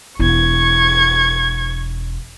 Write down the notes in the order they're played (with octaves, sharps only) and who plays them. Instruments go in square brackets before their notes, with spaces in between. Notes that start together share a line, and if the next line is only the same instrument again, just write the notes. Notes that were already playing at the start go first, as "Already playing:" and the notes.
[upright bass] E1 E4 [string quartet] C#6 G#6